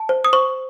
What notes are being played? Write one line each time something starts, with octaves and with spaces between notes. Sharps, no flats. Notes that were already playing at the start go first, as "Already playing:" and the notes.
Already playing: A5
C5
D#6
C5 C#6